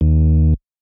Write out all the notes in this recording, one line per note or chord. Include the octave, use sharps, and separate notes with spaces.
D#2